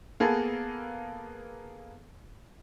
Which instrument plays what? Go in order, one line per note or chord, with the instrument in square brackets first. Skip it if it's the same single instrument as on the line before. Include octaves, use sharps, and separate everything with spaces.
[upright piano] A#3 B3 G#4 A4 B4